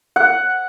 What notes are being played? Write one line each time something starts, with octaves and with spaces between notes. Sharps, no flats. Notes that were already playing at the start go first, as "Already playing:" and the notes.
F#5